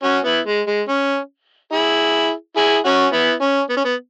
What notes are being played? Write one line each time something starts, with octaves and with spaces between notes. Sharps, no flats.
C#4 F#4
B3 E4
G#3
G#3
C#4
E4 G#4
E4 G#4
C#4 F#4
B3 E4
C#4
B3
C#4
B3